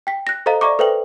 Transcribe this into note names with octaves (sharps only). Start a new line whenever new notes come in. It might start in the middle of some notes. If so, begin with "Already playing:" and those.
G5 B6
F#6 A#6
A4 C5 D#5 F5 A#5
D5 E5 A#5 C#6 D6
A4 B4 C5 E5 G5 F#7